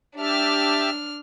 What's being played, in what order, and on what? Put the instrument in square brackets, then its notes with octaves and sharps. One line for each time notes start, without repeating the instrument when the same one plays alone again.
[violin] D4 F6 [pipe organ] G4 E5 A5